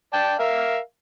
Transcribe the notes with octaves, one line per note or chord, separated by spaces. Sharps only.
D5 G5 A5
A#4 E5 F5